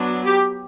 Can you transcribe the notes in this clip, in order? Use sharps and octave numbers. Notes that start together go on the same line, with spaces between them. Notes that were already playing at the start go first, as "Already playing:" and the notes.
Already playing: F#3 B3 D4
G4